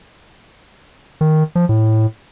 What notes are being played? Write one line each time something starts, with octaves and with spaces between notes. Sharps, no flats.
D#3
F3
A2